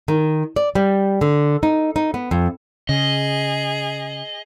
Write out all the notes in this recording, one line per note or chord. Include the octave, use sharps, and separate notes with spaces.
D#3
D5
G3
D3
D#4
D#4
B3
F2
C#3 G#4 D#5